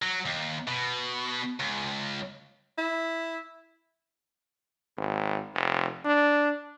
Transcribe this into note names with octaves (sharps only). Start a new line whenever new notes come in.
F#3
D#2
B2
C#2
E4
G#1
F1
D4